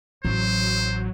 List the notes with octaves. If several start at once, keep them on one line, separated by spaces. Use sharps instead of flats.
A1 F#3 C5